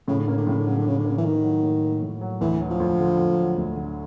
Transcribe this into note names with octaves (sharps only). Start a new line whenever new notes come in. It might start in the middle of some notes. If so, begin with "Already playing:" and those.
A2 C#3
D3
C#3 A#3
D3
A2 C#3
D3
C#3 F#3
D3
A2 C#3
D3
C#3 A#3
E3
A2 D#3
F#3
A2
A#3
A2
F#3
D2 E3
F#3
F3
D2
D3
D2
F#3
D2
D3